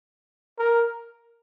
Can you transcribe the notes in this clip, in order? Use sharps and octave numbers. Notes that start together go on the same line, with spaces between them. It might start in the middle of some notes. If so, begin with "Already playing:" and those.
A#4